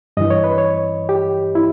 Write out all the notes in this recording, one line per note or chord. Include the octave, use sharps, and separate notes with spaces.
G2 E3 D#5
C#5
B4
C#5
G4
E4